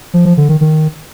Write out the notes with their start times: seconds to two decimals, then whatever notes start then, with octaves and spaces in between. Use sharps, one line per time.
0.14 F3
0.25 F3
0.37 D3
0.49 D#3
0.61 D#3